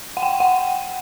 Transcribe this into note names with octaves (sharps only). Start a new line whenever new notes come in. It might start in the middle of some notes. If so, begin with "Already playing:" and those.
F#5
G5
F#5